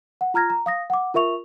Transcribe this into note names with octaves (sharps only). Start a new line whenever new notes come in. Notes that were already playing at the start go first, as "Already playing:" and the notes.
F#5
F4 A#5 F6 G#6 A#6
A#5
F5 D#6 A#6
F#5 D6
F4 A#4 E5 C#6 F7